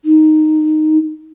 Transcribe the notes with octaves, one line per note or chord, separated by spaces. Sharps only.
D#4